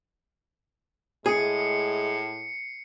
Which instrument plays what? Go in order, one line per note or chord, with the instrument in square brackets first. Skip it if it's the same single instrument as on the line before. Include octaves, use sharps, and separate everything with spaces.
[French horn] A2 [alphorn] G#3 [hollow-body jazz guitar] G#4 [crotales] C7 C#7